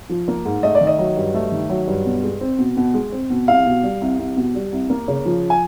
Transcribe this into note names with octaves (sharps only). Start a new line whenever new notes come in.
F3
A#3
G#2
A3 D#5
D5
D#3
D#5
F#3
G2
A3
D#3
F#3
G2
B2
G#3
C4
B2
B2
G#3
C4
B2
C2 F5
B2
G3
C2
C2
B2
G3
C2
A#3
C#3
F3
G#5